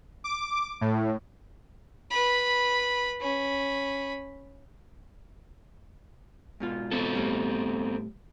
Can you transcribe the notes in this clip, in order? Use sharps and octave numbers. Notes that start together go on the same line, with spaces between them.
D6
A2
B4 B5
C#4 B5
G#2 B2 F4
B3 C4 A4
A2 G3